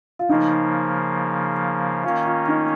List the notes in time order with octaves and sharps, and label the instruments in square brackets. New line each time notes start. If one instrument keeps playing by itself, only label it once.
[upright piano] F4
[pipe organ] C#3 F3 A#3 [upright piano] D#4
[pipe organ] D#3 A#3 C#4 [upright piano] F4
[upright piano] F4
D#4